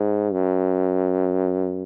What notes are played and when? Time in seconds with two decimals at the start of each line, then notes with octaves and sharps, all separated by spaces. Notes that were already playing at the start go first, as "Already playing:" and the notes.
Already playing: G#2
0.32 F#2